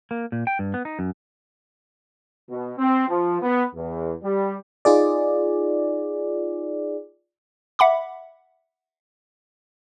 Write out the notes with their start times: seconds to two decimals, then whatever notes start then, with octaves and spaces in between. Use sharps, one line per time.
0.11 A#3
0.32 A#2
0.47 G5
0.59 G2
0.74 B3
0.85 D#4
0.99 F#2
2.50 B2
2.78 C4
3.09 F3
3.42 B3
3.75 E2
4.23 G3
4.85 D#4 F4 G#4 D5
7.79 E5 F#5 B5 D6